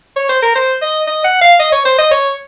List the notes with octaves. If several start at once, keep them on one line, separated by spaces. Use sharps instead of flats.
C#5
C5
A#4
C5
D#5
D#5
F#5
F5
D#5
C#5
C5
D#5
C#5